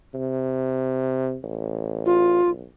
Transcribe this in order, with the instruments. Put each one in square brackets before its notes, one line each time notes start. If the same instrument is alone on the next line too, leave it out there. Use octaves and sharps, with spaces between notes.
[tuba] C3
A1
[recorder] F4
[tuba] B1